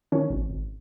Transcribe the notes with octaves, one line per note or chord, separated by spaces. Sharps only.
D#3 C#4
G#1
G#1